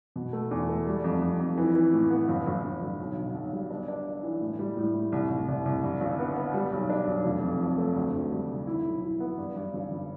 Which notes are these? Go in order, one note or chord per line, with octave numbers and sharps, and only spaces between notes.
B2
A3
E2
A3
G3
F2
F2
F2
E3
E3
A2
B3
G1
G1
G1
G1
B1
B2
B1
G3
D4
D4
D4
E3
A2
G3
A2
A2
C2
C2
C2
C2
G2
G1
B3
B3
G3
B1
D4
B1
F1
F2
F2
A3
D2
D2
G3
C3
E4
B1
E4
B3
G2
G2
G1
G1